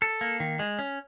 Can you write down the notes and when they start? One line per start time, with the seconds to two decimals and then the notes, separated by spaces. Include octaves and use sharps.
0.02 A4
0.21 A#3
0.40 D#3
0.59 G#3
0.79 C#4